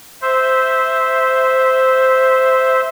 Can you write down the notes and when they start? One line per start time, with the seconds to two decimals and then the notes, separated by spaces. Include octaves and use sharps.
0.22 C5 E5